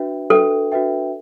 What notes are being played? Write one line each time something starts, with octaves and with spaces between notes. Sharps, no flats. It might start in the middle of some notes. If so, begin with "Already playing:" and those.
Already playing: D4 F#4 B4 E5 G5
D4 F#4 A4 B4 E5 G5
D4 F#4 B4 E5 G5